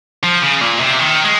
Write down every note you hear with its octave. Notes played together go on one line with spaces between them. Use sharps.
F3
C#3
A#2
C3
D#3
G#3